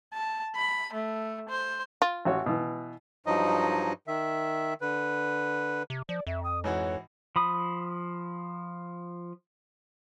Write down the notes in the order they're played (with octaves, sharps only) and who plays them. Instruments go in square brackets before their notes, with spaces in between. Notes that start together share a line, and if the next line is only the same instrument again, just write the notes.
[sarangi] A5
B5
A3
C5
[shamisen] F4
[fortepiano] A1 F#4 C#5
B2 E3
[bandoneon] G2 F3 F#3 D#4 D#5
D#3 E5
D3 B4
[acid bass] C3
[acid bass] F3 [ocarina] D5
[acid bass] F2 [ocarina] E5
[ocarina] D#6
[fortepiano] G#2 E3 F#4 [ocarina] C#5
[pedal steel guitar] F3 B5 D#6